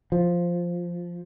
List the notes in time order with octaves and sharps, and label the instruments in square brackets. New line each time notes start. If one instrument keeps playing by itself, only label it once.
[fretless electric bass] F3